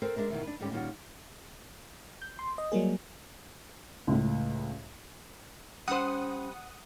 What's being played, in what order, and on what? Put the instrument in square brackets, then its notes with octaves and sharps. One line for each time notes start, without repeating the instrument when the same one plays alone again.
[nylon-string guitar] C4 A4 A#4 C5
G#3 D4 A#4 E5
B2 D#3 E3
D4 B4
G#2 D3 G3 C#4 G4
A#2 D#3 G3 C#4 F4 F#4
[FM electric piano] G6
C6
D#5
F#3 G3 A#3 G#4
[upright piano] C#2 A2
[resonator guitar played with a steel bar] G3 C5 [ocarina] C#4 [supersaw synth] F#5 D#6